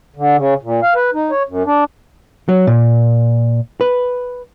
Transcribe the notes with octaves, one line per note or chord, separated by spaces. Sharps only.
D3
C#3
A#2
F5
B4
D#4
C#5
F#2
D4
F#3
A#2
B4